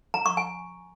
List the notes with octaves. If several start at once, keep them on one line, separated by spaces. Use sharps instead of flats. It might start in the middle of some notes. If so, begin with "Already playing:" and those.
A#5
C#6
G#5